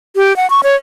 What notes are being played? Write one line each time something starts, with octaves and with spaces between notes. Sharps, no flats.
G4
F#5
C#6
C#5